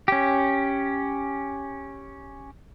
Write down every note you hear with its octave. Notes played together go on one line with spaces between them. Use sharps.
C#4 G4